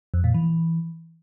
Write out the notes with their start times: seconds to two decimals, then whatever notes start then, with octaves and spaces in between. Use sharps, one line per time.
0.14 F2
0.24 A#2
0.34 E3